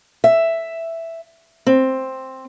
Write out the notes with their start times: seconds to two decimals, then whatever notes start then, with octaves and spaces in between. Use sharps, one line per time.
0.24 E5
1.67 C4